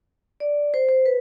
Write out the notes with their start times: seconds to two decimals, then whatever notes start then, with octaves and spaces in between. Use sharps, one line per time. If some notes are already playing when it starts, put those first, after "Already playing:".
0.40 D5
0.74 C5
0.89 C5
1.06 B4